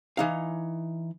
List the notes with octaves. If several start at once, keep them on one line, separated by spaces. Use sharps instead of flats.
E3 D#4 F5